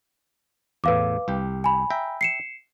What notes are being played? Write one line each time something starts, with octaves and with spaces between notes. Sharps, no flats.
E2 A2 B4 F5 D6
C2 G4
G#5 B5
E5 G5 A#5
C7 C#7 E7